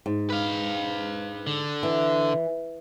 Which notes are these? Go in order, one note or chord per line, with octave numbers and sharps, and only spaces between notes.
G#2
B4 F5
D3
E3